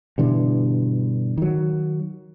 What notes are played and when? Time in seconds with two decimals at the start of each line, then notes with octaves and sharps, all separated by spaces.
0.18 G2 B2 D3 E3
1.38 D#3 F#3